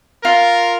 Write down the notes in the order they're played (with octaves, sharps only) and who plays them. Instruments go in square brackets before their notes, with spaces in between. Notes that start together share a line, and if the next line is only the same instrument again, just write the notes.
[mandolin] F4 [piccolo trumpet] A#4